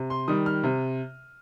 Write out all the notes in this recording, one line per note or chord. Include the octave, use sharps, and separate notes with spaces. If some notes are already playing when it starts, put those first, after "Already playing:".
Already playing: C3
C6
D#3 G3 D#6
F6
C3